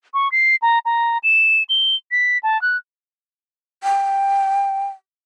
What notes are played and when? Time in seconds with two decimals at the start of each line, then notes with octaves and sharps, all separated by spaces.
0.14 C#6
0.32 C7
0.62 A#5
0.85 A#5
1.23 E7
1.69 G7
2.11 B6
2.43 A5
2.62 F#6
3.83 G5